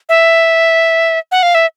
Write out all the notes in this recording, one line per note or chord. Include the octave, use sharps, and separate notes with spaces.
E5
F#5
F5
E5